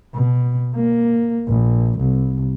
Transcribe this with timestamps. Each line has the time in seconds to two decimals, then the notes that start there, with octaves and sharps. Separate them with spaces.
0.14 B2
0.75 A#3
1.48 A#1
2.00 C2